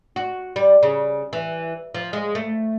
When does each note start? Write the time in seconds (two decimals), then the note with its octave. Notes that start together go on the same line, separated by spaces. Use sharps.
0.16 F#4
0.56 G3
0.83 C#3
1.33 E3
1.95 F3
2.13 G#3
2.35 A3